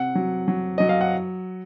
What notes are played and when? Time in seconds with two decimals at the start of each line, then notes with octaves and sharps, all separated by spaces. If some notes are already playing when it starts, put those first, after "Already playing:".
Already playing: C3 F#5
0.15 F#3
0.48 F#3
0.78 F#3 D#5
0.89 F5
1.01 F#5